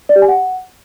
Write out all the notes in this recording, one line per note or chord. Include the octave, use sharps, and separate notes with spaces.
D5
G4
G#5
F#5